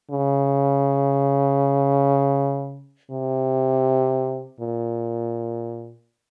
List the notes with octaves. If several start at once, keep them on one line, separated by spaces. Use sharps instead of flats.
C#3
C3
A#2